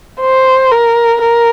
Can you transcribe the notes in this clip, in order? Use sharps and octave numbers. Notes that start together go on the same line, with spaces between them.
C5
A#4
A#4